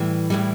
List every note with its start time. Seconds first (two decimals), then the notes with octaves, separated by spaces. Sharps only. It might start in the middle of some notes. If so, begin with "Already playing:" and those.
Already playing: A2 E3 G3
0.30 A2 E3 G3